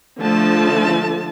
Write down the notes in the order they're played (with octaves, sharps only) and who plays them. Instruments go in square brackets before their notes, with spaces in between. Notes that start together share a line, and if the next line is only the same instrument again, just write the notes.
[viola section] D3 F3 A3 A5